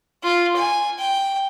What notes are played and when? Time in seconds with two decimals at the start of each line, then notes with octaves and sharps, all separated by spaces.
0.23 F4
0.56 G#5
0.98 G5